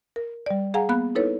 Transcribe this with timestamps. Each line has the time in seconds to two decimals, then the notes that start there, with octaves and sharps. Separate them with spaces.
0.16 A#4
0.46 G3 D5
0.74 G#4 F5 F#5 G#5 A#5
0.89 A#3 B3 F5 B5 F#6
1.15 D#4 E4 A4 B4 C#5